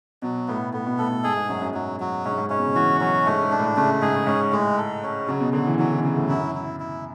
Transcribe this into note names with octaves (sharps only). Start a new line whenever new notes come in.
B2 F#3
A2 B3
A2 B3
B2
A2 A4
A2
G#2 G#4
G#2
F#2 F#3
F#2
G#2 F#3
F#3
G#2 C#4
F#2
G#2
G#2 C#4
B2
C#3
E3 F#4
F#3 C#4
G#2 A3
G#2
D4
A2
C#3 A3
G#2 G#4
G#2 C#4
A2 G#3
A4
C#4
C#3 F#3
B2
D3 F#3
E3
E3 F#3
D3
C#3 F#3
A2
F#2 E4
E4
E4